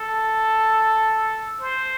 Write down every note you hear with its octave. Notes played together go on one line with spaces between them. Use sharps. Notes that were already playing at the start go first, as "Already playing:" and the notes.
Already playing: A4
C5